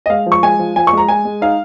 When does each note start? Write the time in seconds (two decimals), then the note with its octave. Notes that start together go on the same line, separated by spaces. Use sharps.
0.06 D#5
0.09 G#3 F5
0.26 F3
0.32 C#6
0.43 G#3 G#5
0.59 F3
0.76 F3 G#5
0.87 C#6
0.92 G#3
0.98 A#5
1.08 G#3 G#5
1.25 G#3
1.41 D#4 F5